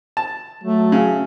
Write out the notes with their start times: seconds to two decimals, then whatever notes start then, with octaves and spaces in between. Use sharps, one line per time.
0.17 A5
0.64 F#3 A3
0.92 C#3